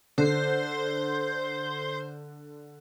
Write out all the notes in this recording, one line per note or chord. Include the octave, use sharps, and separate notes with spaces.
D3 C5